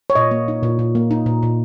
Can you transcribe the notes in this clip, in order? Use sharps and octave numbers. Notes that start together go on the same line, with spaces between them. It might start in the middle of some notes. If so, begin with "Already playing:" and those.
C#5
A#2 D#5
A#3
D#4
A#2
A#2
A#3
D#4
A#2
A#2